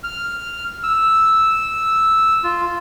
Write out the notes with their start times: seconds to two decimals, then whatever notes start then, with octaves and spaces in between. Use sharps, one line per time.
0.04 F6
0.83 E6
2.44 F4